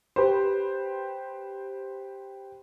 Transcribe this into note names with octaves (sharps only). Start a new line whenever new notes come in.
G4 B4 C5